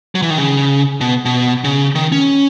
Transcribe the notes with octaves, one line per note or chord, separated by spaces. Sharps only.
F#3
E3
D#3
C#3
B2
B2
C#3
D#3
C#4